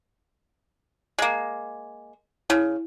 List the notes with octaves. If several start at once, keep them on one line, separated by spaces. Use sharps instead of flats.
G#3 A#3
C#3 E4